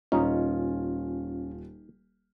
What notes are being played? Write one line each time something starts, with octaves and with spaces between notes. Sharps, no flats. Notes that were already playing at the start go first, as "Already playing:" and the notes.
D#1 C#4 D#4 F4